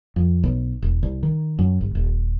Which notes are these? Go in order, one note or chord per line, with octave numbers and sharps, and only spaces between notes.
F2
B1
E1
C2
D#3
F#2
G1
D#1